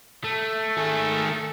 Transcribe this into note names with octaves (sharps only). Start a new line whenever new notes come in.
A3
D#3 G#4 A4